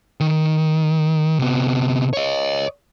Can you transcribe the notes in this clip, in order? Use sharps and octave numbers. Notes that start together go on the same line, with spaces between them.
D#3
C3 B3
C#5 D#5